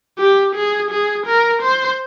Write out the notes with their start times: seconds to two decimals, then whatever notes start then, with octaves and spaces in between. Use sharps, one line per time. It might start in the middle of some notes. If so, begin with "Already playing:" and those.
0.18 G4
0.55 G#4
0.91 G#4
1.26 A#4
1.62 C5